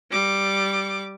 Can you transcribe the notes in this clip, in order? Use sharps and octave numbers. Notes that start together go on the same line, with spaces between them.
G3 D6